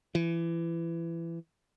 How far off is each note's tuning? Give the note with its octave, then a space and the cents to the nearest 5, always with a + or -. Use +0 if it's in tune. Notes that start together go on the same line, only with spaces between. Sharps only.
E3 +25